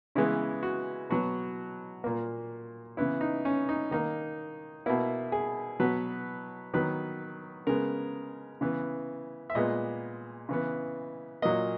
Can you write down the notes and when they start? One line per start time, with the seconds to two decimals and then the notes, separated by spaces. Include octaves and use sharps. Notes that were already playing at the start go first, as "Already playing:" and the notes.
0.15 C#3 E3 G#3 B3 E4
0.63 F#4
1.10 B2 F#3 B3 F#4
2.04 A#2 A#3
2.97 C#3 E3 B3 E4
3.21 D#4
3.45 C#4
3.69 D#4
3.91 D#3 A#3 D#4
4.86 B2 A#3 E4
5.32 G#4
5.80 B2 F#3 B3 B4
6.74 D#3 F#3 B3 B4
7.67 C#3 G#3 B3 A#4
8.61 C#3 E3 B3
9.50 E5
9.55 A#2 G#3 B3 D#5
10.49 C#3 E3 B3
11.42 A#2 F#3 A#3 D#5